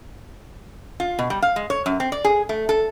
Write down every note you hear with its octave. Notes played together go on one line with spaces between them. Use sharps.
F4
B2
G3
F5
G#3
C#5
F#2
C4
D5
G#4
A3
A4